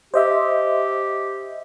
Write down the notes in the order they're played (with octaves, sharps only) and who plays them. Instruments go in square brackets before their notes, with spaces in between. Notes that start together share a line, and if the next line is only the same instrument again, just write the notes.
[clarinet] G4 [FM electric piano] C5 D#5 E5